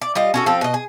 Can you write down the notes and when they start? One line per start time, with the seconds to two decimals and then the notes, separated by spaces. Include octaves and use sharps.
0.02 D5
0.15 G3 F4 D#5
0.34 C#4 F#4 A4
0.46 F3 C4 A4
0.61 B2 D#5
0.74 G#4